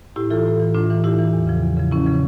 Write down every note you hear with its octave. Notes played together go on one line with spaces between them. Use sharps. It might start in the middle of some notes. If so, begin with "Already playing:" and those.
A2 E4 G4
E3 F4 A4
A2
E3
A2 D4 F4
E3
A2 E4 G4
E3
E2
C#3 F3
E2
C#3 F3
E2 C#4 E4
C#3 F3